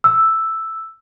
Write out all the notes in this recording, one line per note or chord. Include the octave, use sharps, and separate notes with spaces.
E6